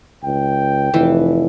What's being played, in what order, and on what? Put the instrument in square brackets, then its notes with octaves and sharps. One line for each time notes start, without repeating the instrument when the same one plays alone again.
[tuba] C#2 [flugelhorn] G5
[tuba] F1 [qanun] E3